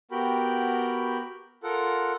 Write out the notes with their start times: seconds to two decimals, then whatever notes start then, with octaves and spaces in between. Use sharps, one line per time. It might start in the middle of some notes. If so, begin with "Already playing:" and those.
0.11 B3 F#4 G4 A#4 G5 B5
1.63 F4 A4 A#4 F#5